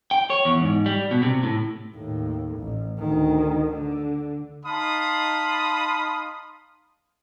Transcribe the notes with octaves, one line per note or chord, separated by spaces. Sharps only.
G5
C#5
E2
G#2
G3
B2
C3
A2
D#2 A2
A1
D2 D#3
D3
D#4 F5 A5 B5 C6 D#6